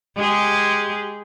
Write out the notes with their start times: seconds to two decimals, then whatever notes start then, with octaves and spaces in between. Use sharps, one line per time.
0.17 G#3 G4 G#4